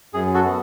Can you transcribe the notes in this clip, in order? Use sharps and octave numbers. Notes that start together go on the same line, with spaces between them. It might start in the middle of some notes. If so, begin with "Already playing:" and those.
F#2 G#4
F#4 A4
B3